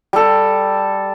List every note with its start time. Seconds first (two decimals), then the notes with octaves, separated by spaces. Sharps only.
0.13 G3 A4